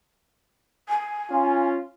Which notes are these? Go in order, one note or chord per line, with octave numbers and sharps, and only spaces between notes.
G#5
C#4 F4